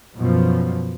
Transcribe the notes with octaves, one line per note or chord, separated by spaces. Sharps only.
F#2 B2 F3